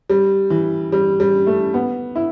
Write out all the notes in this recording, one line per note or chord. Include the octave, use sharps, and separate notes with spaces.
G3
E3
G3
G3
A3
B3
E4